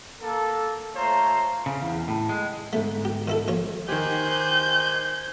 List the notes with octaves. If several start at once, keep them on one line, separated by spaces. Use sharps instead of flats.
A#3 A4
A3 F4 C5 C#5 A#5
C#3
E2
A2
G#3
G#2 D3 A3 B3
G4
D#3 E4 A4
A#1 C#5
D#3 G4 C5 G#5 F#6 G6